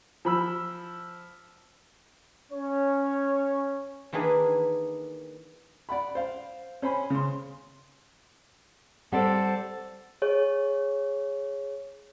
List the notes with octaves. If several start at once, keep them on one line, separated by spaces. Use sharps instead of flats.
F3 B5 E6
C#4 C#5
D#3 E3 A#3 D4 G#4 B5
D5 F#5 B5
C5 F5
C#4 C5 G#5 B5
C#3 C6
G3 C4 A4 C5 D5 F#5
G#4 C#5